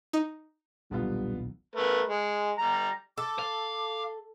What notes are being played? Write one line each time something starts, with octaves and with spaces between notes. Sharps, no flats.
D#4
D#1 B1 D3 G3 B3 F4
A3 A#4 B4
G#3
G3 A#5
A4 D6
F5